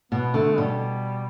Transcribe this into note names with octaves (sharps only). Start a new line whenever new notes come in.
B2 B3
D3 A3
B2 G3